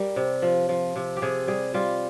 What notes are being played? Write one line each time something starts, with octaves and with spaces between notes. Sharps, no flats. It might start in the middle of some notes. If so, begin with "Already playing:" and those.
Already playing: G3 A#4
C3
F3
F3
C3
G4
C3 G#4
G3 G#4
G3 F4